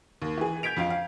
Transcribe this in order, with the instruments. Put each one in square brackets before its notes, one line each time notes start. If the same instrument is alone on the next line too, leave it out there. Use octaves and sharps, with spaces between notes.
[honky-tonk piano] D#2
E3 G#4
G6 G#6 B6 D7 F7
F2 F4 F5
F5